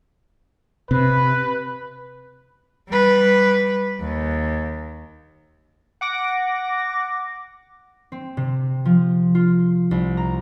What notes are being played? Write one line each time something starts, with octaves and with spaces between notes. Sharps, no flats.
C3 B4
G3 B4
D#2
F#5 D6 A#6
C4
C3
F3
F4
C2
A#5